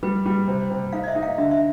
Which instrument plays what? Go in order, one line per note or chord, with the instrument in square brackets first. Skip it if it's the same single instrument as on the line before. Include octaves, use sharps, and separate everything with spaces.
[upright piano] G3 [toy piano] B4
[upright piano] G3
C3
C3
[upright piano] D#4 [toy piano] F5
[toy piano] D#5
E5
[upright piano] D#4
[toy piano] F5
[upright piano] D3 [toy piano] E5
[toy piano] E5